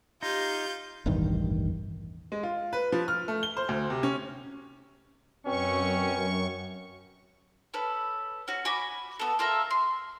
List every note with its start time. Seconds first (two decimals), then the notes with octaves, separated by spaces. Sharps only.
0.23 D#4 F4 G4 G6
1.06 E1 A1 G2 D#3
2.32 G#3
2.43 F4
2.73 B4
2.92 F3
3.08 F6
3.28 A3
3.43 G7
3.57 C5
3.69 D2
3.90 C3
4.03 C#4
5.46 F#2 B2 C4 C#4 C#6
7.74 C#4 A4 B4
8.48 C#4 F#4
8.65 F#4 G#5 B5 D6
9.20 B3 A4
9.39 F4 A4 A#4 E5
9.70 C6